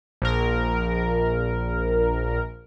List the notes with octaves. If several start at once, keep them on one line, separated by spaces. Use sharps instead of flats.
A#1 A#4